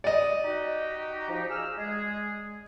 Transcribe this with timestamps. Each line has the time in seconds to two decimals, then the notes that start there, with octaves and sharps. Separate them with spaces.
0.04 D5 D#5
0.44 D#4 F#4 G4
1.29 F3 D#4 G4
1.49 G#4 E6 F6
1.76 G#3 G#4